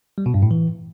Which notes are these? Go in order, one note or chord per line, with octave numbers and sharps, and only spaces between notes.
G3
B2
G2
A2
E3